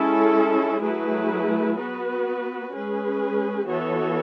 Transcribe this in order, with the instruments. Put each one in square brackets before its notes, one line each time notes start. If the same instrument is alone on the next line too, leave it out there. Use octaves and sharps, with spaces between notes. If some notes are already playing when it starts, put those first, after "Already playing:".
Already playing: [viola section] G#3 C#4 E4 A4
F#3 A3 E4 G#4 B4
B3 F#4 B4
G#3 C#4 G#4 B4
E3 B3 F#4 A4 C#5